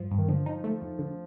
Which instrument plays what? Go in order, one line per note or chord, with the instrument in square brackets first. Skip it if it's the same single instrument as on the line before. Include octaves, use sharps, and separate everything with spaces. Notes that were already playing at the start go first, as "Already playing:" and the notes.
Already playing: [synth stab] G2 F3
G2
[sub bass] D#3
[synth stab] D3 [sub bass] F3
[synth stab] D#4
A3
F2
D3